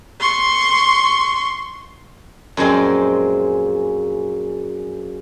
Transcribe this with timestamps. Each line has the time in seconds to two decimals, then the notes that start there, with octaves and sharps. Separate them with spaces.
0.20 C6 C#6
2.57 F#2 A#2 F3 G#3 C4